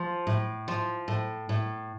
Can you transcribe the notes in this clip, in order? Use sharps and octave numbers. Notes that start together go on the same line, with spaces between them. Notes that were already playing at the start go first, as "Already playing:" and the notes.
Already playing: F3
A2
F3
A2
A2